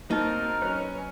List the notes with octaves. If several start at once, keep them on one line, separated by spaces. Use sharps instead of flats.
A#3 C4 D#4 F#4 A#4 A5
F#3 C#4 B4 C#5